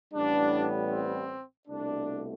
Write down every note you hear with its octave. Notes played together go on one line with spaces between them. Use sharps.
A1 A2 G3 B3 D4
C4
C2 B2 A3 D4